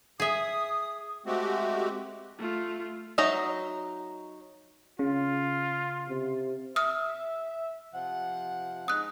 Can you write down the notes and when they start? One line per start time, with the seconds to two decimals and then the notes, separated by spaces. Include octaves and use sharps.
0.20 G#4 E5 D#6
1.26 G#3 A3 C4 F#4 G4
2.39 A3 F4
3.18 F#3 D#4 D#5 E5 A#5
4.99 C#3 F4
6.08 C3
6.76 E5 D#6 F6
7.94 C3 F3 F#5
8.88 G#3 D#4 D#6 F#6